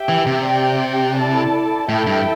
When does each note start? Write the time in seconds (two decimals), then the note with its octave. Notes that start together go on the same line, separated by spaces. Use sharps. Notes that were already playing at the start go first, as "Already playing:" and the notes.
Already playing: G4 E5 G5
0.09 E3
0.26 C3
0.45 G4 D5 G5
1.17 E4 A4 D5 A5
1.89 A2 E4 A4 E5 G5
2.07 G2